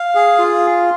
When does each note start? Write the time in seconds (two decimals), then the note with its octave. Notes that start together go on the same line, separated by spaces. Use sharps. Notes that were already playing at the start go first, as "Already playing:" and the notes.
Already playing: F5
0.15 G#4
0.38 F4